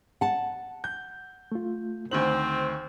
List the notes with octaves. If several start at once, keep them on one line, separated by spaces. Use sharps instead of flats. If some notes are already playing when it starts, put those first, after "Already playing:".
F#5 A5
G6
A3 F4
D2 D#3 C4 C5 F#7